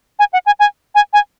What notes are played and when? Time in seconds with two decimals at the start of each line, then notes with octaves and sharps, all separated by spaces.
0.19 G#5
0.33 F#5
0.46 G#5
0.60 G#5
0.95 G#5
1.13 G#5